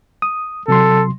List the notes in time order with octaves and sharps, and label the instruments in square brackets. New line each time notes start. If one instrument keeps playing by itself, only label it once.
[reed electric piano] D#6
[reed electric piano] C3 F#3 C6 [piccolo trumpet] A4